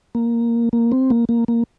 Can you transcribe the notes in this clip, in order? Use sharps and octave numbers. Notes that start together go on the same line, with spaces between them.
A#3
A#3
C4
A#3
A#3
A#3